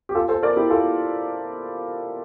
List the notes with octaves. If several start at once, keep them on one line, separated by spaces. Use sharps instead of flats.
G4
F4 A4
A4 C5
A#4 D5
E4 G4
F4 A4